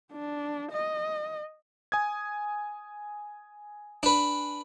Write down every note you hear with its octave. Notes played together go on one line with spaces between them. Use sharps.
D4
D#5
G#5 D#6 G#6
D4 B4